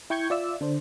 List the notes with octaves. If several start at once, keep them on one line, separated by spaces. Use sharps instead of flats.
E4 G5 C#6 G6 G#6 C#7
F4 D5 E5 E6
D3 D4 C5